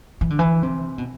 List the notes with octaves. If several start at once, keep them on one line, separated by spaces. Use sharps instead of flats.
E3
D3
E3
C3
B2